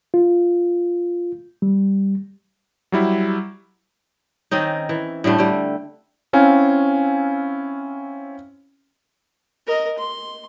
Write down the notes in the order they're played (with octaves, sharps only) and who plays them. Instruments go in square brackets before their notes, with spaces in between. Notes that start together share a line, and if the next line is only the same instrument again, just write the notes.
[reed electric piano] F4
G3
[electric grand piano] F#3 G3 E4
[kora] D#3 C4 C#4 D#4
E3
A2 D3 G3 A3
D3 G3
[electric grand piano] C4 C#4 E4 F5 G#5
[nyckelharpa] A#4 D#5
C6